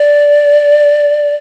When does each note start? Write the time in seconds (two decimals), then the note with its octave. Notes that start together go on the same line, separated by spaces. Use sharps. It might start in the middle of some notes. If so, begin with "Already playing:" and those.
Already playing: D5